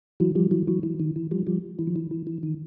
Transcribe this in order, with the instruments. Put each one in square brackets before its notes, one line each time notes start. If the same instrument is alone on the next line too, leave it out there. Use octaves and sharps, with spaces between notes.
[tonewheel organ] E3 F#3
F3 G3
E3 F#3
E3 F#3
E3
D#3
E3
F3 G3
F3 G3
E3
F3
E3
E3
E3
D#3